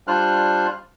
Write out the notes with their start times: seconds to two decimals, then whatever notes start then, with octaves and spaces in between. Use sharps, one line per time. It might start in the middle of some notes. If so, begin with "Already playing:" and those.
0.08 G3 D4 F4 C5 F6 F#6